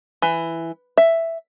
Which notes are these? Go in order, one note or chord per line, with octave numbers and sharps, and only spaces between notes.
E3
E5